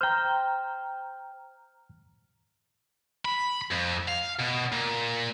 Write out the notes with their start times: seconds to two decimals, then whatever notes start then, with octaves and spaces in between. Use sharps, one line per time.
0.01 C5 G5 A#5 F6
3.25 B5
3.71 F2
4.08 F5
4.39 B2
4.72 A#2